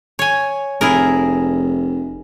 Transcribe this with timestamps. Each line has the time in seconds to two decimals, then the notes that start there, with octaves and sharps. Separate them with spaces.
0.19 C#5 G#5
0.81 F1 E4 G#4 A#4